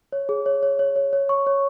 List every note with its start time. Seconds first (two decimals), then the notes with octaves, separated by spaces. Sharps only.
0.12 C#5
0.29 G#4
0.46 C#5
0.63 C#5
0.79 C#5
0.96 C#5
1.13 C#5
1.29 C#6
1.46 C#5